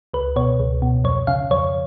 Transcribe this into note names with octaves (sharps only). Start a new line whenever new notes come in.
C#2 B4
B2 C#5
C#2
B2
F2 C#5
C#3 F5
F2 C#5